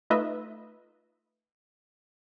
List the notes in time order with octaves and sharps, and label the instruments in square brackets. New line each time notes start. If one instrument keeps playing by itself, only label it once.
[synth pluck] A3 D#4 F4 B4 D#5 E5